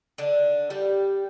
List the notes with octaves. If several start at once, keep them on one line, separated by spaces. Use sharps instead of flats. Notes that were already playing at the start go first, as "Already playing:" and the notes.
D3 D4
G3 G4